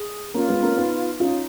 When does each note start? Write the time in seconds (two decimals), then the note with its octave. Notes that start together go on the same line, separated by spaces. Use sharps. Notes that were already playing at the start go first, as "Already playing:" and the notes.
Already playing: G#4
0.34 A#3 C#4 F4
0.49 G#3 B3
0.63 A#3 C#4
0.77 B3 D#4
1.20 C#4 D#4 F4